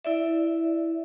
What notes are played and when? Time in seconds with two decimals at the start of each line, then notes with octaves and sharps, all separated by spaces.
0.05 E4 D5 E5